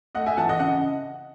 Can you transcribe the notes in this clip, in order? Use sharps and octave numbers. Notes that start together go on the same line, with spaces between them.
A3 D#5 F#5
E5 G#5
E3 F#5 A5
D#5 F#5
C#3 D#5 F#5